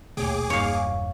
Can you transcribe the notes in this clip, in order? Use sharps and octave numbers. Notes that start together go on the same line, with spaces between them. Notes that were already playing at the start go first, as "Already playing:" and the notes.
A#1 D#2 B2 A3 G#4 C#5 G5 D6
E1 G2 G3 A#3 D#4 C#5 F5